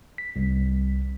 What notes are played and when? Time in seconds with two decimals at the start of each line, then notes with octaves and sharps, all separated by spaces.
0.18 B6
0.36 C2